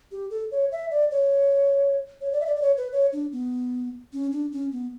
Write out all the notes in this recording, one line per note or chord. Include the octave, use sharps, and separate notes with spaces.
G4
A4
C#5
E5
D5
C#5
C#5
D5
E5
D5
D5
C#5
B4
C#5
D4
B3
C#4
D4
C#4
B3